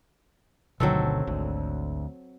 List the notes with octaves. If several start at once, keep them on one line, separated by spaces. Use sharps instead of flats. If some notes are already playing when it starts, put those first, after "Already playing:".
G1 D2 B2 D3 D#3 F#3 C4 A4
G#1 D2